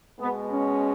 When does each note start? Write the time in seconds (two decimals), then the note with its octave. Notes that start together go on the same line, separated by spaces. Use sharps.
0.18 B2 G#3 B3
0.49 C#4